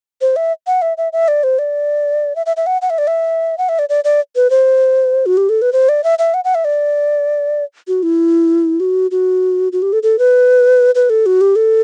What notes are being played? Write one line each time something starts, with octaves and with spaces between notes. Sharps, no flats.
C5
E5
F#5
E5
E5
E5
D5
C5
D5
E5
E5
E5
F#5
F#5
E5
D5
E5
F#5
E5
D5
D5
D5
B4
C5
F#4
G4
A4
B4
C5
D5
E5
E5
F#5
F#5
E5
D5
F#4
E4
F#4
F#4
F#4
G4
A4
A4
B4
B4
A4
F#4
G4
A4